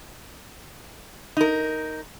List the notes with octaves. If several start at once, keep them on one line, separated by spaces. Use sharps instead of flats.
D#4 A#4